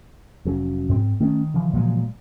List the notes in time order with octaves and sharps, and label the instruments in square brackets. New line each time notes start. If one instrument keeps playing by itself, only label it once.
[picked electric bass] F1 F#3 C#4
[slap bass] G#2 C4
[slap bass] D#3 [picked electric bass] A3 C#4
[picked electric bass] C#3 E3 F3
[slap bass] A#2 F#3 G#3